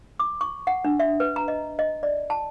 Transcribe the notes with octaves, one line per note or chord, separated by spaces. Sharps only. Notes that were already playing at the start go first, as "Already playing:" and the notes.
D6
C#6
F#5
D4
E5
B4
A#5
D#5
D#5
D5
A5